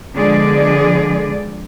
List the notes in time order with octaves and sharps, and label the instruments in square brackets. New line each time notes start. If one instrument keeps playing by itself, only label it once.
[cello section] D3 F3 G#3 B3 G#4 D5